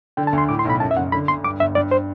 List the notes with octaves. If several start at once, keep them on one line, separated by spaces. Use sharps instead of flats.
D3 G5
A5
D2
C6
A2 D6
C6
B1 B5
F#2 A5
E5
F#1 F#5
D3 B5
D2 C6
G2 D6
G1 E5
G2 D5
C5